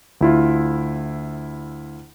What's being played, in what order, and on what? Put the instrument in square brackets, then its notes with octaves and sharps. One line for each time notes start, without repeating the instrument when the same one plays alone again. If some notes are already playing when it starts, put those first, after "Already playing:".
[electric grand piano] D2 E4 F4